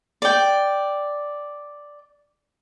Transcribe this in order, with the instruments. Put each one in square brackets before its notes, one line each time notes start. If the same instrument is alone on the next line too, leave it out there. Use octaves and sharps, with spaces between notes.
[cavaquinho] D5 G5